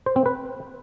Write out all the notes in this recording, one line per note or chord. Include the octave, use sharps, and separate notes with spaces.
C5
C4
B4